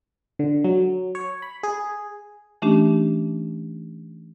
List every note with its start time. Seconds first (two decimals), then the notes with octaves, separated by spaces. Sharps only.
0.39 D3
0.64 F#3
1.15 C#5
1.42 B5
1.63 G#4
2.62 E3 A3 C#4 D4 G4